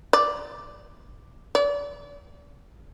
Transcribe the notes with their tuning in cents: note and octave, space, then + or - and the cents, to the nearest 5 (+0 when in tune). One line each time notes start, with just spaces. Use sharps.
D5 +0
D5 -30